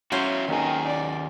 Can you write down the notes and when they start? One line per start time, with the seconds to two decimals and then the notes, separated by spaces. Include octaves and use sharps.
0.12 F#3 C#4 E4 F#4 C5
0.48 D#2 D#3 G#4
0.87 D5